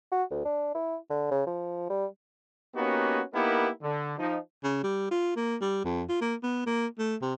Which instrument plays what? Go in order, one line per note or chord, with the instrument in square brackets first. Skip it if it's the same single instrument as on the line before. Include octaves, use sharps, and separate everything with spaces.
[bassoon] F#4
D2
D4
E4
D3
C#3
F3
G3
[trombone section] A#3 B3 C#4 D#4 F#4 G4
A#3 B3 D#4 E4 G4 A#4
D3
F3 D#4
[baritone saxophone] C#3
G3
F4
A#3
G3
F2
F4
A#3
B3
A#3
A3
C3